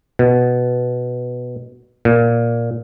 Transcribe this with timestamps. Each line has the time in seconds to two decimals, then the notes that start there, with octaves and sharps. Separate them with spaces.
0.19 B2
2.05 A#2